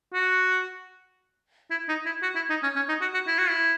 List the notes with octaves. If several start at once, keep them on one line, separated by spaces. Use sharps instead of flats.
F#4
E4
D#4
E4
F#4
E4
D#4
C#4
C#4
D#4
F#4
F#4
E4
F#4
E4